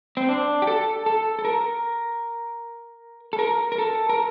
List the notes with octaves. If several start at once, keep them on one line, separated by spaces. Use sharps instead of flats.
C4
D4
G4
A4
A4
A4
A#4
A4
A#4
A#4
A4
A#4